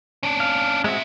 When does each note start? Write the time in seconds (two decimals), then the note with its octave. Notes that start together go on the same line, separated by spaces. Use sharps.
0.23 C#4 D4
0.40 F5
0.84 A#2 G#3 C4 F#4 E5